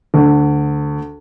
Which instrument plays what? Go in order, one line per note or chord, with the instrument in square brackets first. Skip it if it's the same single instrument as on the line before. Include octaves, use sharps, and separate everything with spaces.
[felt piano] D2